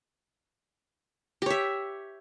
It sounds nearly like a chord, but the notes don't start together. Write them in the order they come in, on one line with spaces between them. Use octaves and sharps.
G4 C#5 E5